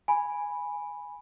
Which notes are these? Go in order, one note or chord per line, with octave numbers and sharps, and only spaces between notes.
G#5 B5